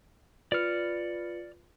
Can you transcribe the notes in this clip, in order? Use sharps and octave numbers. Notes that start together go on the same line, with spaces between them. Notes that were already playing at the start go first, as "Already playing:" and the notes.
F4 B4 D5 F6 C#7